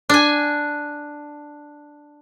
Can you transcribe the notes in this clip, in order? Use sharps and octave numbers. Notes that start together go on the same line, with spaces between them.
D4 G#5